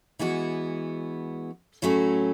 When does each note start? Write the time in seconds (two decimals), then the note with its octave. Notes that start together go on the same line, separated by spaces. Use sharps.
0.19 E3 G#3 B3 F#4
1.82 A2 F#3 A3 C#4 F#4